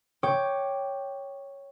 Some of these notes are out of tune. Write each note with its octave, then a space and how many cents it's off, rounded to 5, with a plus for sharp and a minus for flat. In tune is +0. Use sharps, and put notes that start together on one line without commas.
C#5 +0 G5 +0 D6 +5